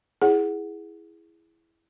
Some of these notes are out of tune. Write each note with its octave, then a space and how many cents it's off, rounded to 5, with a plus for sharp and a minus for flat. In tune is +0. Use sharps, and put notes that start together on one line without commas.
E4 +0 G#4 +0 F#5 +0